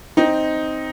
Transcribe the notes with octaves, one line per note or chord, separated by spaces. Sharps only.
C4 D#4